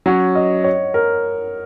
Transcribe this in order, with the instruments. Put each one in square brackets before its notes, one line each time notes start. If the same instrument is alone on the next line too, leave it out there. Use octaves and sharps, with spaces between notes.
[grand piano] F#3 C#4 [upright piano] F#5
[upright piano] D#5
C#5
A#4